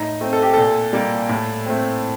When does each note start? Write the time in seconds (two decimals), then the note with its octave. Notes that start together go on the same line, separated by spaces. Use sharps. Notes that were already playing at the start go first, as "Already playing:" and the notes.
Already playing: A2 D#4
0.21 A3 C4
0.33 A4
0.42 G4
0.54 A#2 A4
0.93 G3 A#3
1.29 A2
1.66 A3 C4